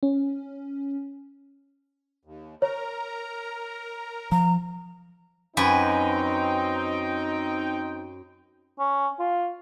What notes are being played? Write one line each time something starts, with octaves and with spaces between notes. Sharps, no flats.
C#4
D#2
A#4 C#5 A#5
F3 A#5
F#2 C4 D#4 B4 G5 G#5
C#4
F4